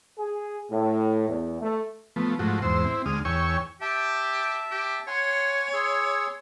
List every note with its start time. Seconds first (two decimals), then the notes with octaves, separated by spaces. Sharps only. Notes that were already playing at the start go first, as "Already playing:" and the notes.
0.18 G#4
0.71 A2
1.28 E2
1.61 A3
2.16 F3 A3 B3
2.39 G#2 F3 A3 F#4
2.62 E2 G#2 C5 E6
2.85 C4 E4
3.06 D2 G#3 D#6 F6
3.25 E2 C#5 G5 G#5 C#6 E6
3.81 G4 E5 A5
4.71 G4
5.07 C#5 F#5 G#5 C6
5.73 G#4 C6 E6